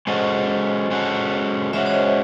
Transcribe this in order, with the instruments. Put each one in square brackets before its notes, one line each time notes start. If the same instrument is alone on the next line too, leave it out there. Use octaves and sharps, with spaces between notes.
[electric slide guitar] G#3 C#4 F#4 A4 [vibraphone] C5 D#5
[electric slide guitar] G#3 C#4 F#4 A4
[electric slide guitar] G#3 C#4 F#4 [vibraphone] C#5 E5
[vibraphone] C#5
C5 D#5